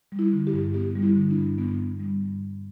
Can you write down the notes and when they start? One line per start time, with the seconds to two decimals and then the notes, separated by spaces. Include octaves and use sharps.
0.12 G3
0.19 E4
0.33 D3
0.47 G4
0.53 G2
0.74 B3 G4
0.95 G3
1.02 E4
1.16 D3
1.30 D4
1.38 G2
1.58 G2 B3
1.79 B3
2.00 G3
2.21 G2
2.41 G2